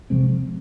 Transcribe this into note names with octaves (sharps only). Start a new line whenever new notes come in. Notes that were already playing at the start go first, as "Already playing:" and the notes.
C3 F3 G#3 C4